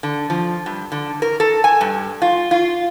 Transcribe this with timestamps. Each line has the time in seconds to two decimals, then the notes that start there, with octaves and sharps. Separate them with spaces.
0.03 D3
0.30 F3
0.66 G2
0.92 D3
1.22 A#4
1.40 A4
1.64 G#5
1.81 G2
2.22 F4
2.51 F4